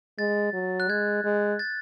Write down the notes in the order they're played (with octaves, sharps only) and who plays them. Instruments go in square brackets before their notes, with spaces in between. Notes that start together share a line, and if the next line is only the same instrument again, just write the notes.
[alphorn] G#3 [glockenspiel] A6
[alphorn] F#3
[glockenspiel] F#6
[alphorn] G#3 [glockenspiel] G#6
[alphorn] G#3
[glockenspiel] A6